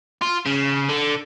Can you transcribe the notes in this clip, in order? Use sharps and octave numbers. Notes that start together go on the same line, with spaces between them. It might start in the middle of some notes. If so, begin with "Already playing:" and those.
F4
C#3
D3